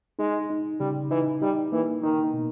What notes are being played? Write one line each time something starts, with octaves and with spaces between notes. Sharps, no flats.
G#3 D#4
D#4
C#3 G3
E3 D#4
G3 D#4
E3 A#3
D#3 D#4
B2